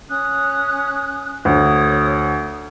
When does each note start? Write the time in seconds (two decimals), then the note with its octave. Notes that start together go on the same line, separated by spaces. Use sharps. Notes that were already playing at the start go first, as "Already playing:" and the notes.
0.09 C#4 D#6 F#6
1.45 D2 C#5 D#6